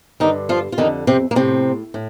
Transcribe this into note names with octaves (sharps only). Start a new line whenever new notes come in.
G2 D3 D#3 D#4
F3 F4
F4
F2 D3 D#3 D#4
C3 C4
A#3
A2 C3 C4
A2